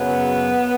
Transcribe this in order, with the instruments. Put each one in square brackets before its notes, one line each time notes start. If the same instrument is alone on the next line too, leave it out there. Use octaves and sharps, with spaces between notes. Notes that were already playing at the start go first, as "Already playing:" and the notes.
Already playing: [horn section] F#2 C#3 F#3 B3